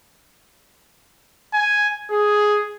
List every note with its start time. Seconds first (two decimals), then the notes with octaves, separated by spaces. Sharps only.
1.54 G#5
2.10 G#4